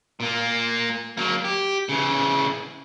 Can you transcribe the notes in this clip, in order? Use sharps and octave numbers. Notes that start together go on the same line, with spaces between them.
A#2 A#3
F#3 A#3
G4
C#3 E3